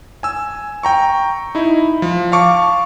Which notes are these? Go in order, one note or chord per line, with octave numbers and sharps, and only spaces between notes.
G#5 E6
G5 A#5 C#6
D#4 E4
F3
F5 A5 C#6 D6